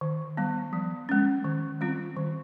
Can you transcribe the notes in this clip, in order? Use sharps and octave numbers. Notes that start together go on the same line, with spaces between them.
D#3
G3 B3
F3
G#3 C#4
D#3
G3 C4 F4
D#3